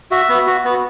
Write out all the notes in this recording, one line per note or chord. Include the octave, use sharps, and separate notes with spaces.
F#4 E5
B3
F#4
B3